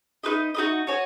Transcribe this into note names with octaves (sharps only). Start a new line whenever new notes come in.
D#4 F#4 B4 D#5
D#4 F#4 B4 D#5
F#4 C#5 G#5